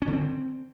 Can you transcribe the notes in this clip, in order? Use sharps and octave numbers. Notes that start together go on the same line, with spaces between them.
C#4
D3
C4